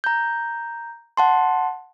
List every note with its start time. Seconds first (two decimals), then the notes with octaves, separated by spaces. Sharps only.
0.04 A#5 G6
1.17 F#5 A5 C6